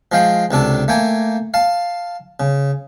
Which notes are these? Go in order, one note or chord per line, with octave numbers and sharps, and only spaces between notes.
F3 G#3 F5 G5
C#2 C3 D4 A4
A3 A#3 G5 G#5
F5 A5
C#3